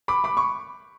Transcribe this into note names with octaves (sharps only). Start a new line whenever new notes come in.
B5 D6
B5 D6
C#6